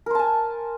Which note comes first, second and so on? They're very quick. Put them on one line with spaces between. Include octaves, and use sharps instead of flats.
A#4 C5 A5 G#5